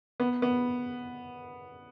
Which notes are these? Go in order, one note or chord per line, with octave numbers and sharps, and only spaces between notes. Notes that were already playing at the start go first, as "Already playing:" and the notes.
B3
B3